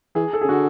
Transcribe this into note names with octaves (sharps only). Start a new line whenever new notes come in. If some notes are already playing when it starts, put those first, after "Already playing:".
E3 G#4
A4
C#3 G#4
D3 F#4